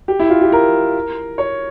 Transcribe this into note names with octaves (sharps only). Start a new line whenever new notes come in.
G4
E4
F4
G4
A#4
C#5